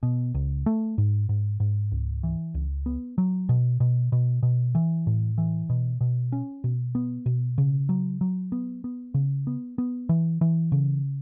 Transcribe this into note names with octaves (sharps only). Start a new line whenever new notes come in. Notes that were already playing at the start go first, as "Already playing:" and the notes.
B2
C#2
A3
G#2
G#2
G#2
C#2
E3
C#2
B3
F#3
B2
B2
B2
B2
E3
A2
E3
B2
B2
C#4
B2
B3
B2
C#3
F#3
F#3
B3
B3
C#3
B3
B3
E3
E3
C#3